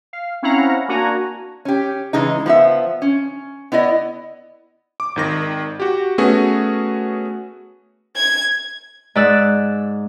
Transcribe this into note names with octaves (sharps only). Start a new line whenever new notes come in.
F5
C4 C#4 E4 F5 F#5 A#5
A#3 D4 F#4 G#5 A#5
C#4 G4
C#3 E3 G#3 D#4
F3 B3 E5
C#4
B3 E4 D5 D#5
D6
G#1 D#3 A#6
F#4 G4
A3 B3 C#4 F#4 G#4 B4
G#6
G#2 D5 E6 F#6